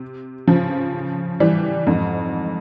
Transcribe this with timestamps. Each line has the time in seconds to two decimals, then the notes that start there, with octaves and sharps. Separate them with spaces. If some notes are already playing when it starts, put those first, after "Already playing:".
Already playing: C3
0.48 C#3 F3
1.40 E3 G3
1.87 F2 G#2